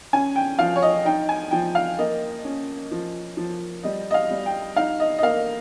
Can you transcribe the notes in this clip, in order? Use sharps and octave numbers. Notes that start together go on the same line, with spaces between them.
C#4 G#5
G5
F3 F5
C#5
D#5
D#4 G5
G#5
F3 G5
F5
A#3 D#5
C#4
F3
F3
G3 D#5
D#5
F5
G3
G5
D#4 F5
D#5
D#5
A#3 F5